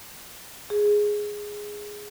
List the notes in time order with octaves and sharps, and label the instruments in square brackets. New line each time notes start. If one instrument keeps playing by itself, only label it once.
[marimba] G#4